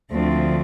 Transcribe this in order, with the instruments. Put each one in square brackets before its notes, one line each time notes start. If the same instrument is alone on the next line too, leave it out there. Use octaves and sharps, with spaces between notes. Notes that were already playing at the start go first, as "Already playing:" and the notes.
[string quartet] D2 D3 F3 A3 C4